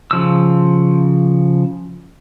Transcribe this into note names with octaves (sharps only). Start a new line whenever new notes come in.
C#3 F3 E6